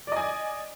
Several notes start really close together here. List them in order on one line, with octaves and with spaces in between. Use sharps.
D5 D#5 G#5